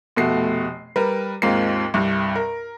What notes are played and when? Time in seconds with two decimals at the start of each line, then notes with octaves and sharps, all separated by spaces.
0.16 F1 B2 A3 F#4 C7
0.96 G3 A#4 B4
1.42 D#2 G#2 C4 F4 A#4 C7
1.94 C2 G2
2.36 A#4